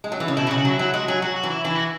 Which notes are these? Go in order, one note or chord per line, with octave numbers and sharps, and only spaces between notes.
G#3
F#3
E3
C#3
B2 E4
E3 F#4
C#3
F#4
F#3 E4
F#3 E4
G#3 F#4
F#3 G#4
F#3 F#4
F#4
E3
E4
E3 E4
F#4